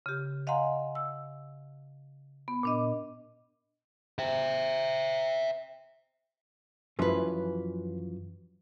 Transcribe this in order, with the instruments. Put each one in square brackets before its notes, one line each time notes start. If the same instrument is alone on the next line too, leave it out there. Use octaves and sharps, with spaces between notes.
[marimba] C#3 G4
D#5 F5 F#5 G#5 A#5 C6
E6
B3
A#2 D4 D#5
[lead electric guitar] C5 E5
[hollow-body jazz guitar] F#2 E3 F3 [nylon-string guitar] C#4 B4